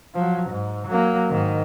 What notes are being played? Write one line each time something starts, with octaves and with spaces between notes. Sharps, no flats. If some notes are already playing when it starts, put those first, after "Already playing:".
F3 F#3
G#2
F#3 A#3
G#2 D#3